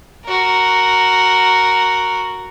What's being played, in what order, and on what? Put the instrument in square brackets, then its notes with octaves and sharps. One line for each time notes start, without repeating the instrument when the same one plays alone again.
[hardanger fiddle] F#4 A#4